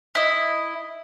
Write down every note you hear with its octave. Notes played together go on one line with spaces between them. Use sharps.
E4 D#5